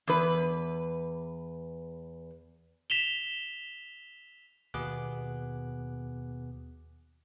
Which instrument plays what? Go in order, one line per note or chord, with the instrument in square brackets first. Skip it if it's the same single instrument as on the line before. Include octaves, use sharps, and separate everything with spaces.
[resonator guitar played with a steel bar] E2 B4
[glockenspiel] B6 E7 F7 G7
[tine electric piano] D#2 B2 B3 G#4 D6 F#6